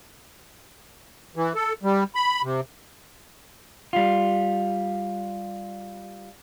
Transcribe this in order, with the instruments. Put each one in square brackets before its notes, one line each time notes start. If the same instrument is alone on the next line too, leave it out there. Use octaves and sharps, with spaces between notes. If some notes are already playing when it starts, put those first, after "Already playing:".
[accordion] E3
A4
G3
B5
C3
[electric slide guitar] G3 F4